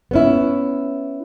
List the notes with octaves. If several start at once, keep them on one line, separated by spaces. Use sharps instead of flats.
B3 C#4 E4